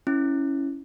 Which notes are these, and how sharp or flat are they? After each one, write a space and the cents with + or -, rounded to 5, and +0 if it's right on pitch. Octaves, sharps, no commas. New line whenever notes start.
C#4 +0 E4 -5